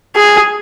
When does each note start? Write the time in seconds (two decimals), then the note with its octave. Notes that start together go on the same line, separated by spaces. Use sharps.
0.16 G#4